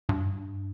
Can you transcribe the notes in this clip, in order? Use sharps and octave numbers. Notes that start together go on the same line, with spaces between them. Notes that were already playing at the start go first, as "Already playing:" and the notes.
G2